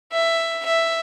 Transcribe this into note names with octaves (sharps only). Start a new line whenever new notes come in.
E5
E5